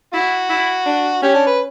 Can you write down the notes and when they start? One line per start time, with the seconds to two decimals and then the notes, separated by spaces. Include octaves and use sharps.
0.13 E4 F#4
0.49 E4
0.86 D4
1.22 C#4 G4
1.34 D4
1.46 B4